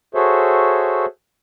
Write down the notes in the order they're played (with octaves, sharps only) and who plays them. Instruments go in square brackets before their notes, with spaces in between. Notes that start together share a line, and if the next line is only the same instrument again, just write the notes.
[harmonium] F#4 G#4 A4 C5 C#5 E5